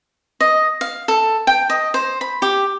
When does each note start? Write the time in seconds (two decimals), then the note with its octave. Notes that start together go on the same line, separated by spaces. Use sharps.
0.41 D#5
0.81 F5
1.08 A4
1.47 G5
1.70 D#5
1.94 C5
2.21 B5
2.42 G4